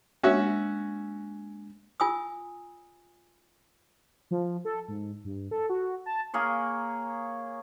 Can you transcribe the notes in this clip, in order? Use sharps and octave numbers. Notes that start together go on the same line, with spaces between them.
G#3 A#3 C#4 D4 F#4 E5
F4 G#5 D#6 E6
F3
A4
G#2
G2
A4
F#4
A5
A#3 G#4 C#5